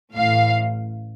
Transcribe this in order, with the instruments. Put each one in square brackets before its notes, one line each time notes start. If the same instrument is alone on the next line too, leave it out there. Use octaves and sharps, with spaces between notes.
[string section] A1 A2 F5